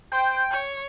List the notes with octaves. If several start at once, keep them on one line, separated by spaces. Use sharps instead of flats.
C5 G5
C#5